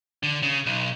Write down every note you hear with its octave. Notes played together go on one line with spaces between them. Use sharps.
D3
C#3
B1